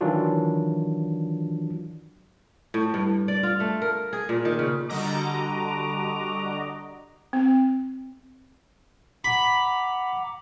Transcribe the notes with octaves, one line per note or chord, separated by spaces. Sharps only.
D#3 E3 F#3 D4 F4 F#4
A2
G2
D5
F4
A3
A#4
G#4
A#2
D#3
C#3
D3 G3 F#4 D#5 A#5 D6
C4
F#5 A#5 B5 D6